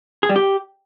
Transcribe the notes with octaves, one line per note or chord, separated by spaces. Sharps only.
G#4
G3
G4